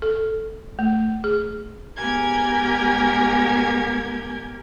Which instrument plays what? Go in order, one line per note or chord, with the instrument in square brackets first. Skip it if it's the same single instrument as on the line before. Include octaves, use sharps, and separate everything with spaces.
[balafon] A4
A3
G#4
[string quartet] G#2 B3 G4 A#4 G#5 G#6